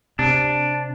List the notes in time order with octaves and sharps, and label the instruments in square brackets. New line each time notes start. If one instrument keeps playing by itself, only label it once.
[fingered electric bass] C3 [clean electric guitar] D4